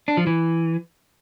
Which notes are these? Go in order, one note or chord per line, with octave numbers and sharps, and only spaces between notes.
D4
F3
E3